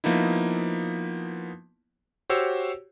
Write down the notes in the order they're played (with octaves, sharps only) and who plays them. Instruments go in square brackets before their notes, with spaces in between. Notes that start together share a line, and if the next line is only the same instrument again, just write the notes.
[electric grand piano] F3 A#3 B3 D#4 E4
F#4 G4 C5 C#5 E6